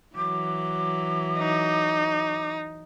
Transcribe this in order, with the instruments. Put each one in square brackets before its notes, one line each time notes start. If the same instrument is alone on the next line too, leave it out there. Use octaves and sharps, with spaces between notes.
[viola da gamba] E3 F#3 [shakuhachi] D6
[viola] D#4